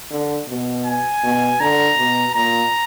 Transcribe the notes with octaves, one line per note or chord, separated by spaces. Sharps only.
D3
B2
G#5
B2
D3 A#5
B2
A#2 A#5